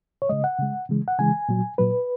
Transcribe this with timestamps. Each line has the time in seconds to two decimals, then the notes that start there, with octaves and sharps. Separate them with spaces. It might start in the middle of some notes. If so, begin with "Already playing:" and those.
0.22 C#5
0.29 C#3 G#3 D#5
0.44 F#5
0.59 C#3 G#3
0.89 C#3 E3 G#3
1.08 F#5
1.19 C#3 E3 G#3 G#5
1.49 A#2 F#3
1.78 A#2 F#3 B4